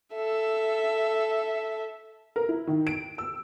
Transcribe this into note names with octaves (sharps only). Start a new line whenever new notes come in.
A4 E5
A#4
E4
D#3
D7
E6